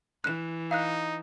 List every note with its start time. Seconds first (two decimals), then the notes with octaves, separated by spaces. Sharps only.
0.24 E3 F#6 E7
0.71 D#4 F5 F#6